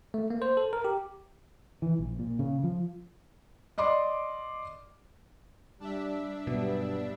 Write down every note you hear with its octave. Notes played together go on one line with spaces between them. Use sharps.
A3
A#3
C5
A4
A#4
G4
E3
A#1
A#2
C#3
F3
D5 D#5 C6 D6
G3 D4 E5
G2 B2 F#3 G3 B3